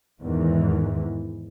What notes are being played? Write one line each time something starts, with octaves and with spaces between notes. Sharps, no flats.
E2 G#2 D#3 E3